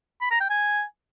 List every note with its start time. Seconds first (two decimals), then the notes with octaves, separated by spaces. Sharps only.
0.21 B5
0.31 A#5
0.41 G5
0.50 G#5